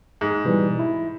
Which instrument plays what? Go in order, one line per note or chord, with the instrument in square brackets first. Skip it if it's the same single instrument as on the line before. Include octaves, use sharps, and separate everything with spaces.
[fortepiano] G#2
[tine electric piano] B2 E3 G3
E4